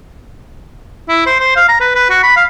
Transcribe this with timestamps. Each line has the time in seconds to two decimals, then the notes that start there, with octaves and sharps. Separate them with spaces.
1.08 E4
1.26 C5
1.40 C5
1.56 F5
1.68 A#5
1.80 B4
1.95 B4
2.10 F#4
2.23 B5
2.36 F5